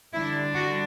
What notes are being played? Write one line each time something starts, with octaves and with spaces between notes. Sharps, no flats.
D3 G3 D4 E4
F#4